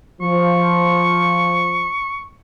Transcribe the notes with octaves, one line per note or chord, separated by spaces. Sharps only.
F3 C#6